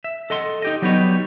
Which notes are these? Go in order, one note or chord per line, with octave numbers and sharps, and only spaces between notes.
E5
A4 D#5 F#5 C6
D#4 G4 D#5
F#3 G3 B3 D#4 B4 C#5